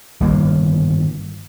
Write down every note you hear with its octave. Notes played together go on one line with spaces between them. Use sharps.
G1 G2 D#3 A#3